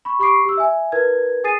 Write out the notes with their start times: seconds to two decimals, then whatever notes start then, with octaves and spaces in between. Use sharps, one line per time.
0.05 B5 C#6
0.19 G4 B5 C#6 D6 C7 D7
0.45 G4 E6
0.57 E5 G#5
0.92 E4 A#4 B4 G#6
1.44 G#4 G#5 D#6 A6 C7 D#7